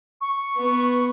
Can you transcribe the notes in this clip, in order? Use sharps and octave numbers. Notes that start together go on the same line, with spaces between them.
C#6
B3